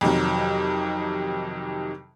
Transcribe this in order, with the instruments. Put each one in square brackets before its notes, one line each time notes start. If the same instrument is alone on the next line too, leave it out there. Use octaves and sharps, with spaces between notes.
[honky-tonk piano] F2 C3 D#3 F#3